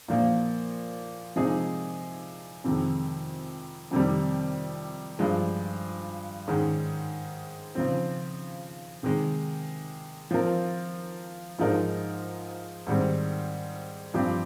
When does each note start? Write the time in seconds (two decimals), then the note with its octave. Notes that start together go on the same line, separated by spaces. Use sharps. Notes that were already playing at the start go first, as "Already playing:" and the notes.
0.08 A#2 F3 A#3
1.36 C3 F3 G#3 D#4 G#4
2.64 F2 C3 D#3 G#3
3.91 F2 C3 D#3 G3
5.19 G2 F3 G#3
6.48 G#2 D#3 G#3 C#4
7.75 C#3 F3 C4
9.03 C3 D#3 G#3
10.31 F3 C4 F4 A#4
11.59 G#2 F3 G#3 D#4 A#4
12.87 G#2 D#3 G3 C4
14.14 G2 F3 C4 G4 C5